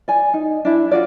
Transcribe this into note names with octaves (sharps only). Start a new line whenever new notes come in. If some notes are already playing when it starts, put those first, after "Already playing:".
D5 G#5
D#4
D4 E4
F4 F#4 D5